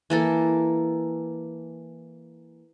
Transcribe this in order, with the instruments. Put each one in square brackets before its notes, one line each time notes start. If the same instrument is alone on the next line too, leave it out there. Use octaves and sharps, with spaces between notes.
[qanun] E3 A#3 A4